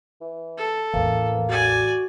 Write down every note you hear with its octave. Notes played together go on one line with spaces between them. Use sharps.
E3
A4
A1 E2 E3 A#3
F#4 D5 G#5